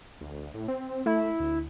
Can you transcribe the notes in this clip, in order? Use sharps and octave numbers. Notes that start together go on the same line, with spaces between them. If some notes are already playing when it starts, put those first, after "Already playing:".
D2
A2
C4
A3 E4
D2